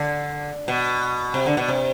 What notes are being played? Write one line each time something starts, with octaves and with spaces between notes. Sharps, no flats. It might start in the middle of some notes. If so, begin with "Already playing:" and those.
Already playing: D3
B2
C3
D3
B2
C3